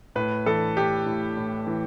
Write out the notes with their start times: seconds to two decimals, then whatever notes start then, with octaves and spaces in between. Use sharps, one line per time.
0.16 A2 B4
0.46 E3 A4
0.77 A2 G4
1.06 A2
1.37 A2
1.67 E3